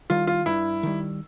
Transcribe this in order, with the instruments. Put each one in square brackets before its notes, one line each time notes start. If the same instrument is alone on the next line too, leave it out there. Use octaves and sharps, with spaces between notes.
[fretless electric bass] D#3 G3 [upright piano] F4
[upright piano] F4
[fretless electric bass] G2 [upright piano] E4
[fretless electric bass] D#3 G3